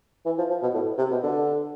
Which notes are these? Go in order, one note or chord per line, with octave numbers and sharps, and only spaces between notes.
E3
F3
F3
B2
A2
C3
B2
D3